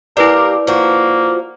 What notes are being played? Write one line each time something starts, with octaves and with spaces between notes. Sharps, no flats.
A#3 E4 G4 A#4 B4 D5
F3 A#3 F#4